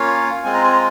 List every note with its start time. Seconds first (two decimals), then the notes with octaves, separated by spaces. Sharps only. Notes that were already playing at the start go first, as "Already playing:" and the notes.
Already playing: A#3 C#4 F4 C#5 F5
0.44 G#3 C4 F4 G#5
0.54 A#5
0.64 G#5
0.73 A#5